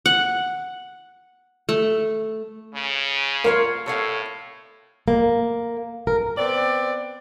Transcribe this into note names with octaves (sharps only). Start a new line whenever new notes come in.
F#5
A3
C#3
A#3 F4 C#5 F5
A2 A4 C#5 F5
A#3
A#4
B3 C4 D5